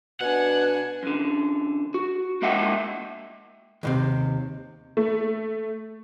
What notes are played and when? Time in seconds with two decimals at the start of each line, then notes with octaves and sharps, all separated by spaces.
0.21 B2 D4 F#5 G#5
1.03 F#2 D3
1.94 F#4
2.42 G#3 A#3 D#5 E5 F#5 G5
3.83 D#2 A2 C3
4.97 A3